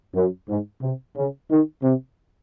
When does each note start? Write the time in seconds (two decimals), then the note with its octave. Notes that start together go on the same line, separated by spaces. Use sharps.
0.15 F#2
0.48 G#2
0.82 C3
1.16 C#3
1.50 D#3
1.83 C3